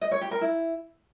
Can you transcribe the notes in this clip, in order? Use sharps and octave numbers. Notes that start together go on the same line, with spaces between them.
D#5
C#5
G4
A#4
E4